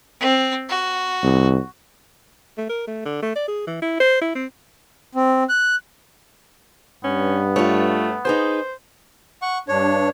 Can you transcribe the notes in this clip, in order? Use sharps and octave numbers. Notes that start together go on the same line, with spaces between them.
C4
F#4
C2
A3
A#4
A3
D3
A3
D5
G#4
E3
E4
C5
E4
C4
C4
F#6
G2 B3 C#4
A3 F4 C#5
D#4 G#4 B4 C5
F#5 C#6
G2 D4 C#5